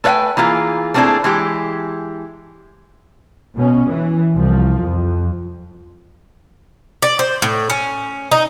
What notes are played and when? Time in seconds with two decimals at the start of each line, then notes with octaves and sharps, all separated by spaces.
0.04 A3 B4 C#5 F5 G5 G#5
0.37 E3 A#3 F4 G#4
0.94 A3 A#3 C4 D4 E4 G#4
1.24 E3 G#3 G4
3.56 B2 C#4
3.90 E3
4.34 C2 F3
4.81 F2
7.02 D5
7.19 C5
7.42 A2
7.70 C#4
8.31 D#4